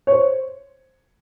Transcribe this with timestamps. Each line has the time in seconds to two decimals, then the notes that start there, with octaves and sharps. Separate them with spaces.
0.07 C#5
0.12 C5